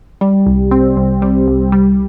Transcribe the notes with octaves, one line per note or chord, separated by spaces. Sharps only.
G3
C2
C4
C2
G3
C2
G3